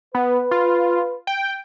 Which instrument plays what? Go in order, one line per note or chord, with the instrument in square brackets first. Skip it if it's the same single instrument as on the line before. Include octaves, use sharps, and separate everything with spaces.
[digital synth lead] B3 [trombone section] B4
[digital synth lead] F4
G5